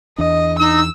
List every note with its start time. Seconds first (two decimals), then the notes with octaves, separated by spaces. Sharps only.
0.18 E2 E3 D4 D#5
0.59 D#4 E6